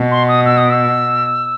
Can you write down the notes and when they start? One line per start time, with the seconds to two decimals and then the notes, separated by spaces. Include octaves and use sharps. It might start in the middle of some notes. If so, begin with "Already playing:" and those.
Already playing: B2
0.11 C6
0.28 D#6
0.46 E6
0.57 D#6
0.70 E6